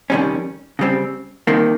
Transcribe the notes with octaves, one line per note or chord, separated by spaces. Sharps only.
F2 C3 D#3 G3 C#4
C#3 G3 C4
C2 C3 D#3 A#3